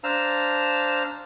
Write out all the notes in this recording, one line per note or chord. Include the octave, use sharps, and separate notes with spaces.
D4 C5 F5 A5 A#5 E6